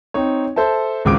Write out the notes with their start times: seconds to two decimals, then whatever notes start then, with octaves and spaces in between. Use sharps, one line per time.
0.14 C4 D#4 C#5
0.56 A4 C5 E5 A5
1.05 G#1 C#2 G#3 D6 D7